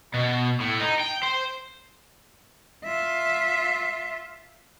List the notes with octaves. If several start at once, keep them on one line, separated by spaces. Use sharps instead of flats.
B2
A2
D#4
G5
C5
F4 E5